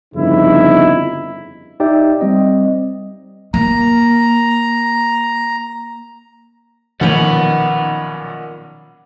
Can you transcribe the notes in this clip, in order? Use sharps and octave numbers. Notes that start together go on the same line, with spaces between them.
G1 F2 C#3 D#4 E4
D#4 G4 D5 E5 G5
G3 C4 D#5
A#3 A#5
B1 A#2 D#3 F3 C#4 F#5 B5